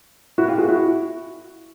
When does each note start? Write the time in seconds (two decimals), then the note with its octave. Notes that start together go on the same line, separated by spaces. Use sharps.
0.38 E4 F#4
0.48 F4 G4
0.58 F#4 G#4
0.68 E4 F#4